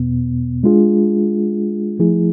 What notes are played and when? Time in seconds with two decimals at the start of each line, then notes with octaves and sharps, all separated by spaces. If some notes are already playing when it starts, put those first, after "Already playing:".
Already playing: E2 B2 B3
0.63 G#3 D4 F4 G#4
1.99 F3 A3 E4 G#4